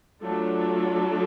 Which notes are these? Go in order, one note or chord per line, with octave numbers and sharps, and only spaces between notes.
F#3 A3 D4 F4 A4